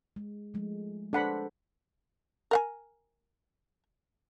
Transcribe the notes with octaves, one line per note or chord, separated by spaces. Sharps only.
G#3
F3 G#3 A3
D4 A4 B4 C5 F#5 B5
A#4 F#5 G#5